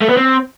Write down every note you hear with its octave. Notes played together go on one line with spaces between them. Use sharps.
A3
B3
C4